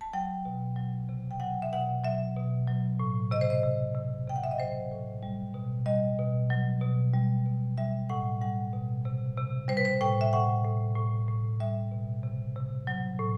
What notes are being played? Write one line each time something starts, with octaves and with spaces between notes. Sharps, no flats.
A5
F#3 G5
B2
F#3
C3
G5
F#3 F#5
E5
B2 F#5
F#3 E5
B2
F#3
A2
C3 D#5
C5
D#5
C3
C3
C3 G5
F#5
E5
D#5
F#3 C5
A2
G3
B2
G3 D#5
B2
F#3
B2
G3
B2
G3 E5
A2 F#5
G3 F#5
B2
C3
C3
G3 C5
B4
C5
A2 G5
E5
A2 F#5
A2
A2
A2
G3 E5
B2
C3
C3
F#3
A2